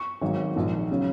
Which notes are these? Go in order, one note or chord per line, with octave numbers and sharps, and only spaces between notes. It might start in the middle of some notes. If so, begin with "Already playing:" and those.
Already playing: C#6
G#1 G#2 F#3
A#1 G#2 D#3
C#3 F#3